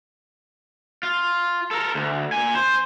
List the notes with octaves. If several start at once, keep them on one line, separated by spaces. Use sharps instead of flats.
F4
A4 A#4
D2
A#2 G#5
C5